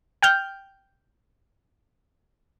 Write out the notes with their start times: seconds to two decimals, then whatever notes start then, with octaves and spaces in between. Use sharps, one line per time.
0.23 G5 F6 G6